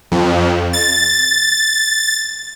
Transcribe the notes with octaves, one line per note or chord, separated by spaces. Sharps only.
F2
A6